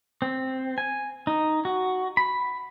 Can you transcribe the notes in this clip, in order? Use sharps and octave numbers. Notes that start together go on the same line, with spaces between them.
C4
G#5
D#4
F#4
B5